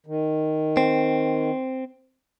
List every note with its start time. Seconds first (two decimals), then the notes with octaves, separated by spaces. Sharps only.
0.06 D#3
0.77 C4